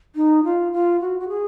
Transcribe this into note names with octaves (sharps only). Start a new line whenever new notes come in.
D#4
F4
F4
F#4
F#4
G#4